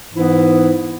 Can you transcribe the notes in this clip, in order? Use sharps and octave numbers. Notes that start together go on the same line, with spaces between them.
G#2 E3 B3 E4